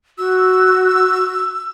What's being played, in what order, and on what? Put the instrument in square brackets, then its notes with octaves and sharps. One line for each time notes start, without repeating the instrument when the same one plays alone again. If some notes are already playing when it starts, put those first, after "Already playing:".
[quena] F#4 [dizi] E6